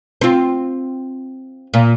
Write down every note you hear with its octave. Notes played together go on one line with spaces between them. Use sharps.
C4 F4
A#2